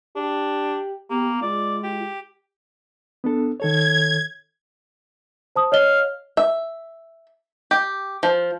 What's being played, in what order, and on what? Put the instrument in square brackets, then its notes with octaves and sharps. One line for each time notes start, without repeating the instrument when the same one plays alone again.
[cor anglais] D4 [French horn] G4
[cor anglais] A#3 [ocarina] B3 [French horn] G4
[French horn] G#3 [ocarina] F4 [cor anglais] D5
[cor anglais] G4
[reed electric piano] B3 D4 A4
[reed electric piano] D#3 A4 C#5 [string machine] G#6
[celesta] C5 A5 D#6
[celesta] C#5 D#5 G7 [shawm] F5
[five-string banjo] E5
G4
F3